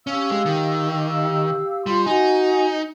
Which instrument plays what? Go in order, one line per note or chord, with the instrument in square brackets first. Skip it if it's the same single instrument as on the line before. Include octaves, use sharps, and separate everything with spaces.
[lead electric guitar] C#4 [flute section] G4 F5 E6
[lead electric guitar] G#3
D#3
[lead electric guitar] G3 [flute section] F4 C6
[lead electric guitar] D#4 [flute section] F#4 F#5 G#5